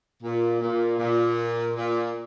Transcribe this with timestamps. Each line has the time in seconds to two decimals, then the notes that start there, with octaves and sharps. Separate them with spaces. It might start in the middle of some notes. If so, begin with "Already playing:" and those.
0.22 A#2
0.60 A#2
0.98 A#2
1.75 A#2